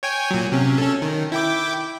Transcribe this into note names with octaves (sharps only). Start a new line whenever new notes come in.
C#5 G5 G#5
A#2 F#3
C3 C#4
C#4 A4
D#3
E4 G5 D6